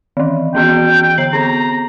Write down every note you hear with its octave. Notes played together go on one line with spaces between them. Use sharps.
D#3 E3
E3 B3 F#4 G5
D3 C7 F#7
B3 C4 A#5